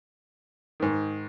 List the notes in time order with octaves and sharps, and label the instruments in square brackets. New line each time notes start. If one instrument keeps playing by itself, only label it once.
[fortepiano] G#2 D#3